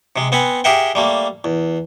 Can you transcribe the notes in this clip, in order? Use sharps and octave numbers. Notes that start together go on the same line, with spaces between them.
C3 G#3
B3 C4 F#5 G#5 B5
G4 G#4 A#4 E5 F#5 G5
G3 A3 A#3
E2